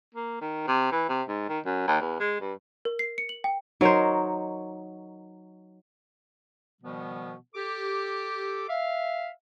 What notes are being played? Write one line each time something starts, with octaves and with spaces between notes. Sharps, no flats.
A#3
D#3
C3
E3
C3
G#2
D#3
F#2
D#2
E2
G#3
G2
A#4
C7
C#7
F#7
G5
F#3 D#4 A#4 C5 C#5
B2 D#3 F3 G3 B3
G4 A4 D6
E5 F5